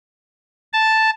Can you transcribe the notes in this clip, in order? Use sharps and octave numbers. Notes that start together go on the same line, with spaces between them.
A5